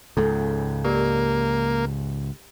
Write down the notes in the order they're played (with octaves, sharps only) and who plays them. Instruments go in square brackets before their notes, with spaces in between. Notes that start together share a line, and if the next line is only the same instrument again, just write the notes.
[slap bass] C#2 G#2 [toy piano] A4
[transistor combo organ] A#3 [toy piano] G4 A#4 D5